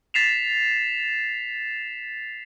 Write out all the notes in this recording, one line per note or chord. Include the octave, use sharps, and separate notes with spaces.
A6 B6 C7 E7 F7